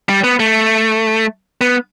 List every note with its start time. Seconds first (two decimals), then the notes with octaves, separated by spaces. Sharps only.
0.09 G3
0.24 B3
0.40 A3
1.61 B3